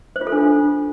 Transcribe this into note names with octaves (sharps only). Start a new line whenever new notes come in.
C5
F4
A4
D4
F4